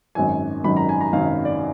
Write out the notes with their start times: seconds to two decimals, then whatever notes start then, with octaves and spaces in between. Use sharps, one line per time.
0.15 G#1 F#2 D#3 F#3 G#5
0.64 G#1 F#2 D#3 F#3 B5
0.77 A#5
0.89 G#5
1.01 A#5
1.13 G#1 F#2 D#3 F#3 F5
1.45 D5